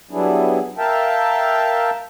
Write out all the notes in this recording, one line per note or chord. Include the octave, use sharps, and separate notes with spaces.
F#3 G3 B3 D4 E4 G#4
A#4 E5 F5 G5 A5